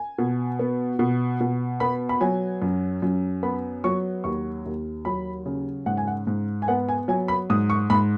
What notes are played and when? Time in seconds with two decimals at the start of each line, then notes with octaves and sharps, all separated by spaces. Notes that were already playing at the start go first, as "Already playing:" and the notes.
Already playing: G#5
0.18 B2
0.59 B3
0.99 B2
1.41 B2
1.80 B3 B5
2.09 B5
2.21 F#3 G#5
2.62 F#2
3.02 F#2
3.43 B3 B5
3.84 F#3 C#6
4.24 D#2 C#6
4.66 D#2
5.05 F#3 B5
5.46 C#3
5.86 G#2 F#5
5.97 G#5
6.07 F#5
6.27 G#2
6.62 G#5
6.68 B3 F#5
6.89 G#5
7.08 F#3 G#5
7.28 B5
7.50 G#2 D#6
7.70 C#6
7.90 G#2 B5